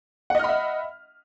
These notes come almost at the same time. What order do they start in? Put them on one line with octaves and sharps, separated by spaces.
F#5 D#5 F6 B5 E5